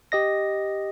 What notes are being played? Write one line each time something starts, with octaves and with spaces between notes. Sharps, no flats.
G4 D#5 A#6